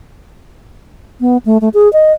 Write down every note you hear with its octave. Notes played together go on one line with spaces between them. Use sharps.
B3
A3
A3
G#4
D#5